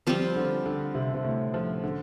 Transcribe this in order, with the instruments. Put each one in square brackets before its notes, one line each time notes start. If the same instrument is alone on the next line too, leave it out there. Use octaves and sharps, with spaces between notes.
[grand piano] F3 [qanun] G3 C4 F4
[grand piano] D3
D3
C3
C3
A2
F3
D3